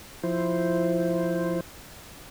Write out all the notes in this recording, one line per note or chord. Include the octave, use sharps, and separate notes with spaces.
F3 E4 C5